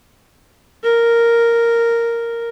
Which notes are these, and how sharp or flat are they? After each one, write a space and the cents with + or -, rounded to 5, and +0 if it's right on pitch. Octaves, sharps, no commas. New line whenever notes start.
A#4 -5